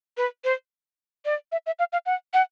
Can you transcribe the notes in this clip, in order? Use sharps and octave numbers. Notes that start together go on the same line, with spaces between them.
B4
C5
D5
E5
E5
F5
F5
F#5
F#5